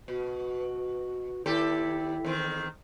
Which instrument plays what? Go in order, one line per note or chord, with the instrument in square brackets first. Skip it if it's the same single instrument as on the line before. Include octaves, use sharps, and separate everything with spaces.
[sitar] B2 [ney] F#4
[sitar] D#2 G4 A4 [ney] E4
[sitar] E2 D#3 C4